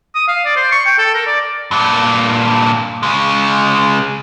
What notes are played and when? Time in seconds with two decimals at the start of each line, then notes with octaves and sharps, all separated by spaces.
0.15 D#6
0.28 F5
0.45 D5
0.56 C5
0.72 C#6
0.86 G5
0.98 A4
1.14 A#4
1.27 D5
1.71 G2 A#2
3.03 C#3 G#3